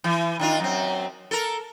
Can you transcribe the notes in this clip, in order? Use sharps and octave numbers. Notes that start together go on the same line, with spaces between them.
E3
D#3 D4 F4
F#2 C4
A4 A#4